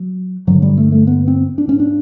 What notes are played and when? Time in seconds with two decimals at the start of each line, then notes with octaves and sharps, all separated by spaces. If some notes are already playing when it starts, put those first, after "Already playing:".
Already playing: F#3
0.47 G2 D3 F#3
0.62 G3
0.78 A3
0.92 A3
1.07 B3
1.28 C4
1.58 D4
1.67 G#2 C#4
1.80 D4